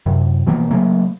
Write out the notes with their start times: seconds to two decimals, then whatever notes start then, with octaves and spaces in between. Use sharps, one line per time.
0.06 F#2 C3
0.47 B2 E3 F3 A#3
0.71 C#3 F#3 A3 A#3